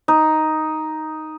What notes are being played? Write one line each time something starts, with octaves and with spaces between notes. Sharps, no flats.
D#4